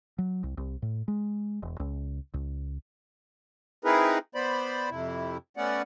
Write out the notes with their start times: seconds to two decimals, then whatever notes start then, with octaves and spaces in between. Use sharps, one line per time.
0.18 F#3
0.43 C2
0.57 C2
0.82 A2
1.08 G#3
1.62 E1
1.80 C#2
2.34 C#2
3.85 C4 D#4 E4 G#4 A#4 B4
4.35 B3 C5 D5 B5
4.90 F2 C3 E4
5.57 A3 B3 C#4 D5 F#5